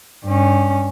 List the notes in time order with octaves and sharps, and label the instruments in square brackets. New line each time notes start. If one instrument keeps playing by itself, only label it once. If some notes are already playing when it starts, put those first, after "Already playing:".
[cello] G2 C#4